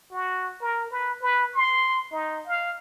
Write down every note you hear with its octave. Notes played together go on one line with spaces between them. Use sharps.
F#4
A#4
B4
B4
C6
D#4
F5